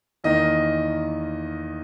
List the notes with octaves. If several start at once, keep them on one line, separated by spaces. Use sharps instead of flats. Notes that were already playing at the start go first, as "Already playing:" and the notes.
E2 D#3 A#3 D#5